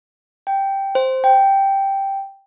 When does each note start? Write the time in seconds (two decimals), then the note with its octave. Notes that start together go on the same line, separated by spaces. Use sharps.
0.47 G5
0.95 C5
1.24 G5